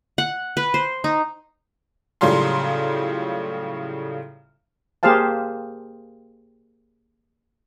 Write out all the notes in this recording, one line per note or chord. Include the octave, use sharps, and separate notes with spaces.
F#5
B4
C5
D#4
A2 C#3 F#3 G3 F4 C6
A#3 G4 G#4 C5 F5 A5